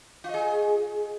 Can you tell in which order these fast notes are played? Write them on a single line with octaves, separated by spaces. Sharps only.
F4 D#5 G#4